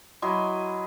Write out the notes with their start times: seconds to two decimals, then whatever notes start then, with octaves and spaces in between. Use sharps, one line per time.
0.22 F#3 E4 D#5 C6